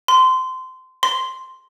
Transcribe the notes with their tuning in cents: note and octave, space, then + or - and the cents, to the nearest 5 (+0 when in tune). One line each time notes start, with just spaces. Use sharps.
C6 -20
C6 +0